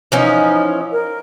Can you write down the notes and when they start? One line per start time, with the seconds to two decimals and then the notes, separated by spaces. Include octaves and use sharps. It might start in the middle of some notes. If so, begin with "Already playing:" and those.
0.12 E3 F3 C#4 D#4
0.91 A#4